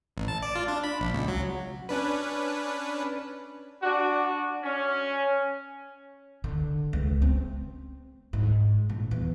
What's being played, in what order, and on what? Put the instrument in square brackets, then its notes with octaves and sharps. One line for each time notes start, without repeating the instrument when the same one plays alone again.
[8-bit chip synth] A1
A5
D5
F4
D4
B5
A#1
C#2
F#3
C#4 D4 B4
[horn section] D4 F#4
C#4
[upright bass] D3
C#2
C4
G#2
A#1
E2